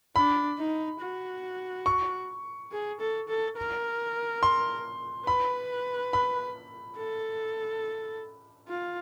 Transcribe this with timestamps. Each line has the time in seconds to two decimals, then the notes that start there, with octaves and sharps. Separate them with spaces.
0.16 D4 B5
0.59 D#4
1.01 F#4
1.86 C#6
2.72 G#4
3.00 A4
3.28 A4
3.57 A#4
4.43 C6
5.27 B4 B5
6.13 B5
6.98 A4
8.69 F4